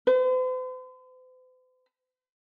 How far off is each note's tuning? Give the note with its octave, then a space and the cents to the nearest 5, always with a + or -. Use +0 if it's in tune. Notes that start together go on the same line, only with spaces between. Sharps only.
C5 -45